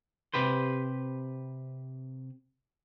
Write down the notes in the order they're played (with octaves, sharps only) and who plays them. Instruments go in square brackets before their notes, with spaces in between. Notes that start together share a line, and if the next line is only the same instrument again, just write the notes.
[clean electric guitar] C3 G4 B4 C5